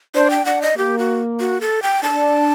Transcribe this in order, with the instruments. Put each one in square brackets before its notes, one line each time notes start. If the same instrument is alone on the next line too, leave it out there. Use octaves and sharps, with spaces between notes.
[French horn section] D4 [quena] C5
[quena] G5
[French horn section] D4 [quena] F#5
[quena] D#5
[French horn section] A#3 [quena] G4
[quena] F#4
F#4
A4
G5
[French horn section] D4 [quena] A5